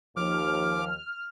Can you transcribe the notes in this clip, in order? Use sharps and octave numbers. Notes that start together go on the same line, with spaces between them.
D#2 F3 D6 F6